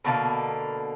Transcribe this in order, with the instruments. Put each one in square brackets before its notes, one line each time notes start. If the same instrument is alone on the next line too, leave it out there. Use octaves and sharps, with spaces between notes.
[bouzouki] B2 D3 A3 A#3